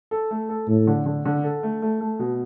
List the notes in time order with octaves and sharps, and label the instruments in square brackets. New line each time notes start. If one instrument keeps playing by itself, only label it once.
[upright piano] A4
A3
A4
[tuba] A2 [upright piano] A4
[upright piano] D3
D3
D3
A4
A3
A3
A3
B2